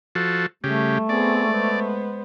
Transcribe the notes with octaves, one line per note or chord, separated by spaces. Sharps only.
F3 F#4 A4
C#3 G3 A3 G4
B3 C4 G#4 D5
G#3 B3 C5